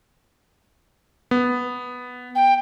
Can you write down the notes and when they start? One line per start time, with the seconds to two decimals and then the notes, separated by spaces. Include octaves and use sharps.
1.31 B3
2.35 G5